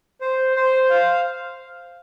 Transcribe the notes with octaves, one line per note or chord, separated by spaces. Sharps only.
C5
C5
F5